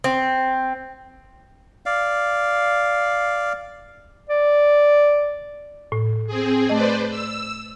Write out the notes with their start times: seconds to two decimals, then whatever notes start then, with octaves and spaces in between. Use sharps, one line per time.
0.04 C4
1.86 D5 F5
4.30 D5
5.92 A2
6.27 C4 G#4
6.69 A3 B4 C5 D5 D#5
7.10 E6